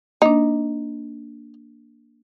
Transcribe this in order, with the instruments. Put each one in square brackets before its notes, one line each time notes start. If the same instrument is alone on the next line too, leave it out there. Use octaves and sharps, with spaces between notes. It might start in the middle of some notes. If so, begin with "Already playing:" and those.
[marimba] A#3 D4 [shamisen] D#4